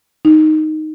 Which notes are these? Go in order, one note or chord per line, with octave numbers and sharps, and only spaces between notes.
D#4